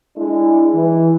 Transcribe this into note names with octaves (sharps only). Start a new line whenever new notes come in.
G#3 D4 E4
E3